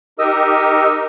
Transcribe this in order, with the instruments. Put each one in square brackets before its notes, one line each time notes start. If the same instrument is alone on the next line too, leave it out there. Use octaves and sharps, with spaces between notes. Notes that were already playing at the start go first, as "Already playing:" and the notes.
[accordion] D#4 G4 A#4 [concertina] D#5 E6